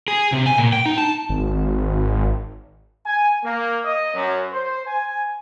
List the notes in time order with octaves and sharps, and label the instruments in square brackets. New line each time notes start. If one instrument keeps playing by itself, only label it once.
[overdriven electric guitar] G#4
C3
G#5
A#2
G5
D#4
A5
[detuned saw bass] G#1
[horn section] G#5
A#3
D#5
F#2
C5
G#5